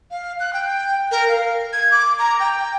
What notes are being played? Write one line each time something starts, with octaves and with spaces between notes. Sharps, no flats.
F5
F#6
G5
A#4
F5
G#6
D6
A#5
G5